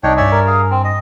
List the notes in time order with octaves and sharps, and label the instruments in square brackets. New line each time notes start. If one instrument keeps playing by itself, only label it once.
[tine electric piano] C2 [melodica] D4 C#5 G5 [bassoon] D#4
[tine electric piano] G2 G#5 [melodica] C#5 D5 E5
[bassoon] A#4
[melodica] G#4 F5
C4
D#5